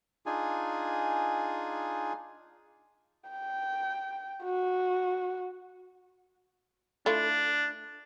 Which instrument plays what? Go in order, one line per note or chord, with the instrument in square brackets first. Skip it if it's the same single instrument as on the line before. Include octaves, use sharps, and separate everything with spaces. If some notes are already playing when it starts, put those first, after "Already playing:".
[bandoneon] D4 D#4 F4 G#4 G#5
[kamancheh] G5
F#4
[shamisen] A3 E4 F4 [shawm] D4